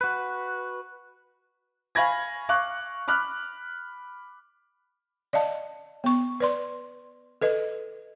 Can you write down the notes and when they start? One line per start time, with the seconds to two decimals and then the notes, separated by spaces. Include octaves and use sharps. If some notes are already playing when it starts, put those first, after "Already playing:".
0.01 F#4 B4
1.95 F5 G#5 B5 C#6 G#6 A#6
2.49 F5 C#6 D6 F#6
3.08 B5 D6 F6 F#6
5.33 D5 D#5 F5 A5
6.04 B3 C#6
6.40 B4 D5 C6
7.42 A4 B4 D#5